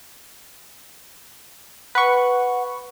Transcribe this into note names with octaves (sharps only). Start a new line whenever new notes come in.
B4 F#5 C#6